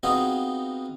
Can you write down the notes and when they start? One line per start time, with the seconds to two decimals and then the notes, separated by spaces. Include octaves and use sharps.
0.03 B3 C4 D#4 F4 F#4 G#4